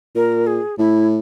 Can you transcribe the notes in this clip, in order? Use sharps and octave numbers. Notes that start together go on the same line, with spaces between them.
A#2 A#4
G#4
A2 E4